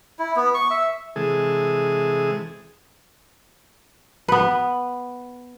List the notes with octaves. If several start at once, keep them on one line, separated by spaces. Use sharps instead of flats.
E4
B3
C#6
E5
C3 E3 G#3 G#4 A4
B3 B4